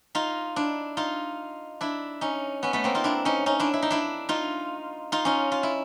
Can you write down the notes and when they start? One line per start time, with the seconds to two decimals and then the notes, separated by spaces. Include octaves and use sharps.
0.15 D#4 F4
0.56 D4 E4
0.97 D#4 F4
1.81 D4 E4
2.21 C#4 D#4
2.63 B3 C#4
2.73 A3 B3
2.84 A#3 C4
2.94 D#4 F4
3.04 D4 E4
3.25 C#4 D#4
3.46 C#4 D#4
3.60 D4 E4
3.74 E4
3.82 D#4
3.90 D4 E4
4.29 D#4 F4
5.12 D#4 F4
5.25 C#4 D#4
5.52 F4
5.63 E4